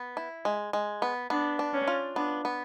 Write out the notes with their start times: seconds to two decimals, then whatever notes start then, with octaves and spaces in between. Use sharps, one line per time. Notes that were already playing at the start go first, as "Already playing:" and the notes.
Already playing: B3
0.17 E4
0.45 G#3
0.73 G#3
1.02 B3
1.30 B3 D4
1.59 D4
1.74 C#4
1.88 F4
2.16 B3 D4
2.45 B3